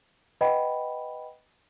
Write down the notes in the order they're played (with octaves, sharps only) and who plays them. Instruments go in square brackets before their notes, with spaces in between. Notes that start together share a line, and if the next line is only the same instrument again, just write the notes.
[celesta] B4 D#5 F#5 G5 B5